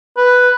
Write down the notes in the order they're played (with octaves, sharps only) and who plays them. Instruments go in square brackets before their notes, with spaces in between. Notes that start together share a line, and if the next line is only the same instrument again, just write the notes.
[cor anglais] B4